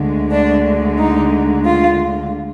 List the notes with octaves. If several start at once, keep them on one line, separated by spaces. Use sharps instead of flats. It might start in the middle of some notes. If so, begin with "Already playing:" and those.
Already playing: D2 D3 G#3
D4
D#4
F4